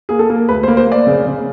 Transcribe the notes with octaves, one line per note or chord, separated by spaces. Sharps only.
A#3 G#4
A4
A#3
D2 B4
C5
A#3
C5
A#3 D5
C#3
C#3